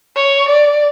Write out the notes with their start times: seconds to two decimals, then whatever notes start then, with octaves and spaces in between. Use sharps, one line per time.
0.16 C#5
0.49 D5